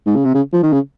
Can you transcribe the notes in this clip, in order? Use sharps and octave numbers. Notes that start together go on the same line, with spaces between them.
G#2
C#3
C3
C#3
F3
D#3
C#3